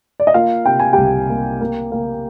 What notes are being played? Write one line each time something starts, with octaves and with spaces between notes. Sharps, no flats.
D5
D#5
A#3 F4 F5
C3 G5
G#5
C2 G4 G5
A#3
A#3
A#3